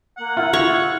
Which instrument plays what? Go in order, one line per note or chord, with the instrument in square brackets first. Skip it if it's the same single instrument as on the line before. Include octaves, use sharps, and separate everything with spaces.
[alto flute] A#3 [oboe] F#5
[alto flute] E4 [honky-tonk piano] F4
[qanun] C#5 C#6